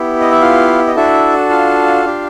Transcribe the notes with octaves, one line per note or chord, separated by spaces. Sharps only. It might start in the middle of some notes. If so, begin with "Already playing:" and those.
Already playing: B3 E4 G4
D#5
E5
F4 F5
D#5
D4 E4 F#4 A4 E5
F4 F5
D4 G4